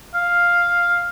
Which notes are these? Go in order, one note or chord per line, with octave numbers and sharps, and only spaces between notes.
F5